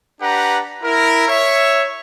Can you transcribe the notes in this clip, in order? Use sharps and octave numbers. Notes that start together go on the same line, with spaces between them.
D4 G4 B4 F#5 A#5
E4 A#4
C#5 E5